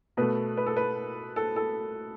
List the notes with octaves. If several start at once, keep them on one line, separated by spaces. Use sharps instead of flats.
B2 A3 B4
B4
A4
B4
A4
A4